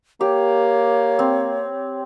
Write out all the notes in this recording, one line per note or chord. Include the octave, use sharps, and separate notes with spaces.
A#3 G4 C#5
C4